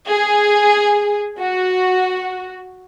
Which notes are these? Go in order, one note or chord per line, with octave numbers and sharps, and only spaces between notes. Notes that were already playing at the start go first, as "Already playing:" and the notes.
G#4
F#4